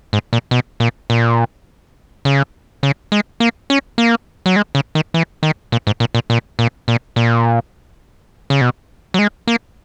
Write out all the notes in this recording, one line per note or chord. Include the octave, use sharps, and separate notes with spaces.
G#2
A#2
B2
A#2
A#2
C#3
C#3
G#3
A#3
C#4
A#3
F#3
G#3
C#3
D#3
E3
D#3
A#2
G#2
A#2
A#2
A#2
A#2
A#2
A#2
C#3
B2
F#3
G#3
A#3